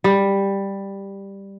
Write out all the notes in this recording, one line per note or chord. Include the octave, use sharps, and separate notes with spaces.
G3